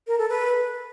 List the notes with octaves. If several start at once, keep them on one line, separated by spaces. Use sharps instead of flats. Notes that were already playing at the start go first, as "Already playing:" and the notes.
A#4
A4
B4